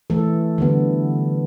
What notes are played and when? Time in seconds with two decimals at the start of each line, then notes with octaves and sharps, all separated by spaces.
0.10 E3 A3 A4
0.58 D3 G3 B3